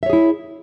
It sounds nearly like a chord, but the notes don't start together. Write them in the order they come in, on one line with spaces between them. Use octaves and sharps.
E5 C#5 G#4 E4